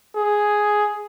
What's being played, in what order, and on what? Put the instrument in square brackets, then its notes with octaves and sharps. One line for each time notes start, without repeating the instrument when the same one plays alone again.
[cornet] G#4